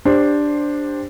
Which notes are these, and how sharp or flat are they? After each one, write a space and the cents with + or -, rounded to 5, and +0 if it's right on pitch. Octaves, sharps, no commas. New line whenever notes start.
D4 +0 G4 +10 C5 +5